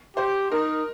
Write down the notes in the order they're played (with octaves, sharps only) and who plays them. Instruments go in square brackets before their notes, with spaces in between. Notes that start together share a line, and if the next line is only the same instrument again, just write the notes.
[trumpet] G4 [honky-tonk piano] C5
[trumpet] D#4 [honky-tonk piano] A#4